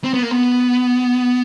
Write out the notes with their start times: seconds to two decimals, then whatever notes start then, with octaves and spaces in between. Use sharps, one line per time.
0.04 C4
0.14 B3
0.23 A#3
0.31 B3